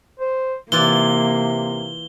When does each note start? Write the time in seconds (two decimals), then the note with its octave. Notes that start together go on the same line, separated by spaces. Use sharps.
0.19 C5
0.72 C3 E3 A#3 F4 D5 G7